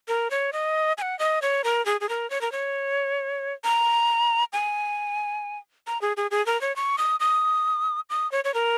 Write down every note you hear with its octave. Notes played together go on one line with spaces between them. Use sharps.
A#4
C#5
D#5
G#5
F#5
D#5
C#5
A#4
G#4
G#4
A#4
C#5
A#4
C#5
A#5
G#5
A#5
G#4
G#4
G#4
A#4
C#5
C#6
D#6
D#6
D#6
C#5
C#5
A#4